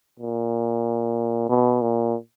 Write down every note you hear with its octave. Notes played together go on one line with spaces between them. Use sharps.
A#2
B2
A#2